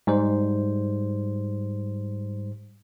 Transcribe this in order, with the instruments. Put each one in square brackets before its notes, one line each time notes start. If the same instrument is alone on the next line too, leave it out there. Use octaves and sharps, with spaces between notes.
[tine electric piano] G#2 G3 C5